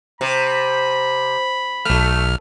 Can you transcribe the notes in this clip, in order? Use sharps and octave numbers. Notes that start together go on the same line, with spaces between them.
C3 B5
B1 A3 F6